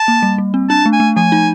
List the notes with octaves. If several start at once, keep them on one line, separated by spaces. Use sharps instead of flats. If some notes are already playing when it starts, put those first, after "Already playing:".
Already playing: A5
A#3
G3
G3
C4
D4 A5
A3
G#5
A3
F3 G#5
D#4